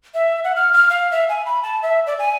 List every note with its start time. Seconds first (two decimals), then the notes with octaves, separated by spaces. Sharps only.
0.14 E5
0.44 F#5
0.56 F6
0.73 F6
0.90 F5
1.11 E5
1.29 G#5
1.46 B5
1.63 A5
1.82 E5
2.06 D5
2.19 G#5